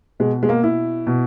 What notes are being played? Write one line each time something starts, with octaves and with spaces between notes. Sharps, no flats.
B2 G#3
G#3
A#3
E4
B2